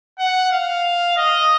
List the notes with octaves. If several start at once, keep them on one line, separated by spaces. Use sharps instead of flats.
F#5
F5
D#5